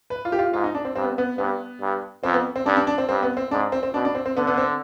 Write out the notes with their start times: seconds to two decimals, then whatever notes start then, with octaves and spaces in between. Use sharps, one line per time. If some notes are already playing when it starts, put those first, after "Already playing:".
0.10 B4
0.25 F4
0.32 G4
0.39 F4
0.53 G#2 F4
0.64 D#4
0.74 D4
0.85 C4
0.96 G2 C4
1.03 B3
1.18 B3
1.38 G2 B3
1.81 G2
2.23 F2 C4
2.34 B3
2.56 C4
2.66 G2 D4
2.76 D4
2.87 D4
2.98 C4
3.09 G2 C4
3.23 B3
3.37 C4
3.51 G#2 D4
3.72 C4
3.83 C4
3.94 B2 D4
4.05 D4
4.15 C4
4.26 C4
4.37 D3 B3
4.47 B3
4.58 C4